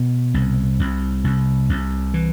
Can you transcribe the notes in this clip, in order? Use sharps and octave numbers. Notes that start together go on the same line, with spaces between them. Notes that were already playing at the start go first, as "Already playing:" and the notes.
Already playing: B2
C2
C2
C2
C2
E3